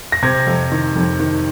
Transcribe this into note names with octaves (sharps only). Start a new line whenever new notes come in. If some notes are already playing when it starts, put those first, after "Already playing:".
A#6
C3 G#6
F2
D#3
F2
D#3